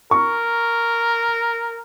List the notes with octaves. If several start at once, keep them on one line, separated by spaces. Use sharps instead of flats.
A#4 C#6